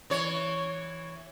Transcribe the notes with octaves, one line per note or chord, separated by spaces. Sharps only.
E3 C#5